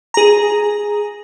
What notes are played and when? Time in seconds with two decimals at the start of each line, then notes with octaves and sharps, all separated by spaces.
0.14 G#4 A#5